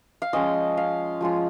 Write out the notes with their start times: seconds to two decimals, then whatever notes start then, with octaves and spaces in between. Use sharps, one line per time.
0.22 F5
0.33 F3 G#3 C#4 F4 D#5
0.77 F5
1.21 F3 G#3 C#4 F4